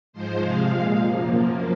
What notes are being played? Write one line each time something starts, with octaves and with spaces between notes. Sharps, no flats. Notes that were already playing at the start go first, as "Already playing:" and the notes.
G#2 F3 G#3 C5
C3 F3 G#3 F5
A#2 G#3
F#2 F3 A#3